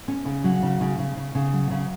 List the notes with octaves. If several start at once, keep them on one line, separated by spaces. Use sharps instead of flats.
C#4
C#3
F#3
C#3
C#3
C#3
C#3
C#3
F#3
C#3